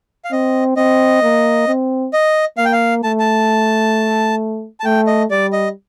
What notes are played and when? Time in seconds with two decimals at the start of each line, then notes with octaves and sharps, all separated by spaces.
0.25 F5
0.32 C4 D#5
0.77 C4 D#5
1.23 A#3
1.68 C4
2.13 D#5
2.58 A#3 F5
2.65 G5
2.73 F5
3.04 A3 A5
3.20 A5
4.80 A5
4.85 A3 G5
5.07 D#5
5.30 G3 D5
5.53 D#5